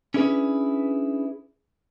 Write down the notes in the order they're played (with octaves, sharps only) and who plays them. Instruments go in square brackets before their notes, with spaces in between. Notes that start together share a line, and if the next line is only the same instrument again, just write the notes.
[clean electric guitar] C#4 D4 E4 G#4 B4